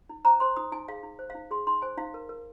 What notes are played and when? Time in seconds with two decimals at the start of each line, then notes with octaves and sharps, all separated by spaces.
0.09 D#4
0.25 C5 A#5
0.40 C5 C6
0.56 D#4 D#6
0.72 D#4 G#5
0.88 G#4 F5
1.03 D#4
1.19 C5
1.30 F5
1.35 D#4
1.51 G#4 C6
1.67 D#4 C6
1.82 C5 G#5
1.97 D#4 F5
2.14 A#4
2.29 A#4